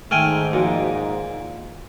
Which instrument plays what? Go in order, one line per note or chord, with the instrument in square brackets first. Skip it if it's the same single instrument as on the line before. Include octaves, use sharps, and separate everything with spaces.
[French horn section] G#2 [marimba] D#3 F6 [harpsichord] A3 G5 G#5
[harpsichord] A#2 [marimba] F3 F#4